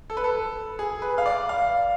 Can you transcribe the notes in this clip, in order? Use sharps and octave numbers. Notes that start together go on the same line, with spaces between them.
A4
B4
A4
G#4
B4
F5
D5
F5